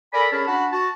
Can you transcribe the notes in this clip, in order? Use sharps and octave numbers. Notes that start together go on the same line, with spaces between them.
A4 A#4 D5 G#5 B5
C#4 G#4 A#4 C#5 A5 B5
D4 F#4 F#5 A5 B5
F#4 A5